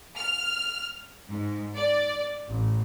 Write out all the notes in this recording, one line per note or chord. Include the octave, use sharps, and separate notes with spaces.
F6
G#2
D5
A1